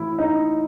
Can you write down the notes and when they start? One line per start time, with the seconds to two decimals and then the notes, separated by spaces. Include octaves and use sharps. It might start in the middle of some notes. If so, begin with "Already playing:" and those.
Already playing: A2 E3 E4
0.19 D#4